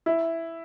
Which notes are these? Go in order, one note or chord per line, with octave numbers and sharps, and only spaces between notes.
E4